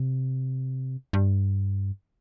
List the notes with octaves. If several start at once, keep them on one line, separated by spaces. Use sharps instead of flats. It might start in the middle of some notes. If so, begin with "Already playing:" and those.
Already playing: C3
G2